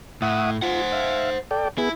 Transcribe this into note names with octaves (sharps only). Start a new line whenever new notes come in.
A2 E5 F#5 D#6
F4 C5 F#5
E5 F5
A4 D5 G5
B3 E4 G#4